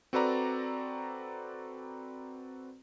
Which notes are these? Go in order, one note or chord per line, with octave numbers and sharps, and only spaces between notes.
C4 F#4 A4 B4 D5 A#5